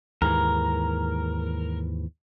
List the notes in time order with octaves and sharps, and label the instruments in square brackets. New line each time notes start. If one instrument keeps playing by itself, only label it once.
[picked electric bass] D#2 G#2 E3 [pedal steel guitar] A#4